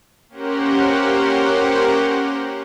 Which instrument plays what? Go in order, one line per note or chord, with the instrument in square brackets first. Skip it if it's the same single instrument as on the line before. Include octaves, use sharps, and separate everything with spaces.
[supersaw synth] A#3 C#4 G4 A#4 C5 F#5